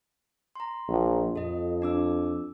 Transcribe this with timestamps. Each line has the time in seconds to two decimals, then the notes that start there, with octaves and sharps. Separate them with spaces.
0.56 A#5 C6
0.88 A#1
1.36 F2 A4 D#5
1.82 D4 D6 E6